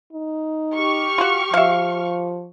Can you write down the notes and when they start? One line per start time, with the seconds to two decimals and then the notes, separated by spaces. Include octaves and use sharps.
0.13 D#4
0.75 G4 C#6 F6
1.18 F4 F#4
1.54 F3 E5 F5